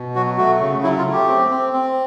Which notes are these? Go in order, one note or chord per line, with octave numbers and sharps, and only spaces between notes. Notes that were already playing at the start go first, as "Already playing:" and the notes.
Already playing: B2
F#3 F#4
A3 F#4
C#3
F#3 E4
F4
A3
G4
C4
C4
C4